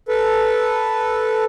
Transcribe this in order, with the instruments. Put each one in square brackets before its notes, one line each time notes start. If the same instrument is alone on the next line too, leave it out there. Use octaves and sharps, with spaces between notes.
[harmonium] A4 B4